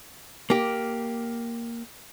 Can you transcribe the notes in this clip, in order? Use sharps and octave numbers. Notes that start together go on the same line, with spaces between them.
A#3 G4